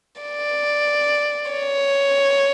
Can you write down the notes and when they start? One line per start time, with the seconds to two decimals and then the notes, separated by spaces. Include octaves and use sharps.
0.22 D5
1.51 C#5